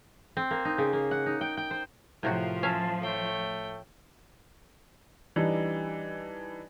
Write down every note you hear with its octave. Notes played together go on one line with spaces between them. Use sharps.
C4
A#3
D#4
C#3
A#3
F#5
D#4
G5
G5
C5
A2 C3 F3 F4 F#4 A#4
C#4 E5 F5 A5
A3 C#5 G5
E3 G3 D4 D#4